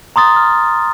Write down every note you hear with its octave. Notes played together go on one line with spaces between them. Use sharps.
A#5 C6 D#6 A6
F6